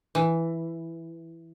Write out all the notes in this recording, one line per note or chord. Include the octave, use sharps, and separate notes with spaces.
E3